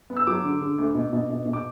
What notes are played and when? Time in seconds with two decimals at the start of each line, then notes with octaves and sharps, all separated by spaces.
0.10 B3
0.17 E6
0.27 F#3 D6
0.44 D3
0.61 D3
0.78 D2
0.95 B2
1.13 B2
1.30 B2
1.46 B2
1.53 D6